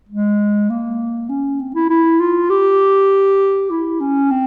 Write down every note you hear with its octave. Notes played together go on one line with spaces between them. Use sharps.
G#3
A#3
C#4
C4
E4
E4
F4
G4
E4
C#4
C4